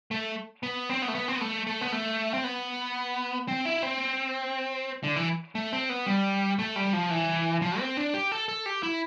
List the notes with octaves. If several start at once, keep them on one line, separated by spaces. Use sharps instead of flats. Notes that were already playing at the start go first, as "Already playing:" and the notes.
A3
B3
C4
B3
A3
B3
C4
B3
A3
A3
B3
A3
C4
B3
C4
E4
C4
D3
E3
A3
C4
B3
G3
A3
G3
F3
E3
F3
C4
D4
G4
A4
A4
G4
E4